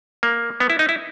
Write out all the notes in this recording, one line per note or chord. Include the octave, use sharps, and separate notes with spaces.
A#3
B3
E4
D#4
E4